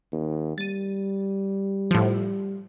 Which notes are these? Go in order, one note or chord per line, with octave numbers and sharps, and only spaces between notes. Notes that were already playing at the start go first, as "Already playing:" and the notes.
D#2
G3 A6 D#7
A2 F3